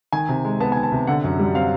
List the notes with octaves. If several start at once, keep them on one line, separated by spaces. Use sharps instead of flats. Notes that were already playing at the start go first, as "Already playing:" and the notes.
D#3 G#5
C3
G#3
B3 A5
D#3 G#5
A5
C3
D3 F#5
F#2
G3
C4 F5